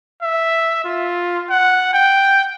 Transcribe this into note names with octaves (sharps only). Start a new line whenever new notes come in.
E5
F4
F#5
G5